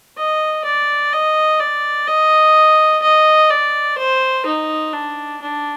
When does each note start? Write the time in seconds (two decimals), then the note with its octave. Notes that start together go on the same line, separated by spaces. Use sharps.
0.17 D#5
0.65 D5
1.13 D#5
1.60 D5
2.07 D#5
3.02 D#5
3.50 D5
3.98 C5
4.46 D#4
4.93 D4
5.41 D4